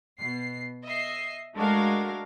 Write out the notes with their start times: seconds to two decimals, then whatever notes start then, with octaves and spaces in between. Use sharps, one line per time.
0.17 B2 C7
0.83 D#5 E5 C7
1.55 G#3 A3 D4 F#4 A#4 F5